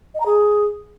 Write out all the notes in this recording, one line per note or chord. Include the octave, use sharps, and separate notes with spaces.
D#5
A#5
G#4